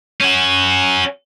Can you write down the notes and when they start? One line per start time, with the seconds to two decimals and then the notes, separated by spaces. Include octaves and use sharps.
0.21 C#4 F#4